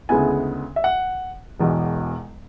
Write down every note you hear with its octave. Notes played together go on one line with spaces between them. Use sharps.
D2 C#3 G#3 B3 E4 G#5
E5
F#5
E1 E2 B2